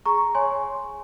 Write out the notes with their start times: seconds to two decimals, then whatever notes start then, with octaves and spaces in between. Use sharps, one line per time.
0.06 G#4 A#5 C#6
0.35 C#5 G#5 C6